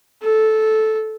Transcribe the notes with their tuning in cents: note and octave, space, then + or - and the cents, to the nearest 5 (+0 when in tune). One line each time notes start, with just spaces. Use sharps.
A4 -10